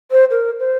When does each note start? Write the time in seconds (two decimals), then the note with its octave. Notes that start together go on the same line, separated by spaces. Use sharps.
0.11 C5
0.31 A#4
0.59 C5